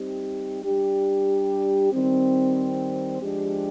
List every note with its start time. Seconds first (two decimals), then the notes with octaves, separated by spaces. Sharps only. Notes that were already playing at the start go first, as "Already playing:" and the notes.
Already playing: G3 C4 D#4 G4
0.64 G3 D4 G4
1.91 D#3 G3 C4
3.21 F3 G#3 D4 G4